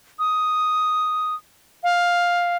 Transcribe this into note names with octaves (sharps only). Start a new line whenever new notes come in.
D#6
F5